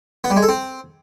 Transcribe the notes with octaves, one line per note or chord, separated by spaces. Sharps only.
B3
G3
G#3
A4
C4